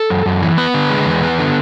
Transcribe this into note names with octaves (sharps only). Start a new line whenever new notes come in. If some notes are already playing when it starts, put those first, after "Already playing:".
Already playing: A4
F#2
F#2
E3
B3 B4
D3
G#3
E2
B3
D3